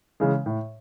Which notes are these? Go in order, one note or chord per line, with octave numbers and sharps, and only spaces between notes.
C#3 E3 G#3
A2